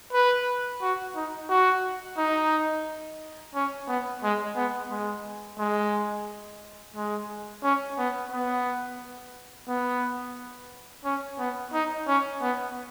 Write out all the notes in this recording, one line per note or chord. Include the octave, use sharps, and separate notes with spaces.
B4
F#4
D#4
F#4
D#4
C#4
B3
G#3
B3
G#3
G#3
G#3
C#4
B3
B3
B3
C#4
B3
D#4
C#4
B3